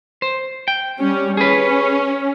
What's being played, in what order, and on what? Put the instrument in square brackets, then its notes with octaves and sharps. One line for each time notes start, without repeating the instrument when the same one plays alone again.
[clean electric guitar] C5
G5
[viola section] G3 C#4
[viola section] C#4 [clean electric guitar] G#4 B4